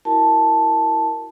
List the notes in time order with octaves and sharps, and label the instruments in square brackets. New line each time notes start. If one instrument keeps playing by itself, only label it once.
[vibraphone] E4 F#4 A#4 A5